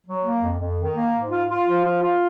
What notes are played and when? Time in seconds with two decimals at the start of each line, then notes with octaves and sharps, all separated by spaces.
0.06 F#3
0.24 A#3
0.42 F2
0.60 F2
0.78 D#3
0.95 A#3
1.13 G#2
1.31 F4
1.49 F4
1.66 F3
1.84 F4
2.02 F4